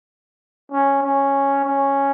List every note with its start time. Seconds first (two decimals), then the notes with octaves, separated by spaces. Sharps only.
0.72 C#4
1.03 C#4
1.65 C#4